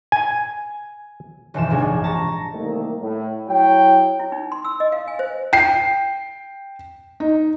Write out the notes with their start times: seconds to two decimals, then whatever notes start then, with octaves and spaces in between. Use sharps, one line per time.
0.12 G#5
1.54 D#1 F#2 B2 E3 F3 E7
1.70 A#1 G#2 C3 D4 G#6
2.04 A5 A#5 C#6 A#6
2.53 C2 D#3 A3 A#3
3.01 A2
3.47 F#3 E4 C#5 G5
4.19 E4
4.32 D#4
4.52 C6
4.65 E6
4.80 D#5
4.92 F5
5.08 G#5
5.19 C5
5.53 G5 C7
7.20 D#4